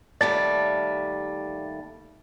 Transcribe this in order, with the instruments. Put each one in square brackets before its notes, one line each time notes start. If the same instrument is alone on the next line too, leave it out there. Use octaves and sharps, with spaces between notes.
[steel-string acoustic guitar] D#2 G3 A3 [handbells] D5 A6